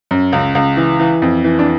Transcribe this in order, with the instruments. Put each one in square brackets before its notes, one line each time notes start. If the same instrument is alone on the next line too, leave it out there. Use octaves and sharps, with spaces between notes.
[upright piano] F#2
C#2
C#2
E3
E3
F2
E3
D4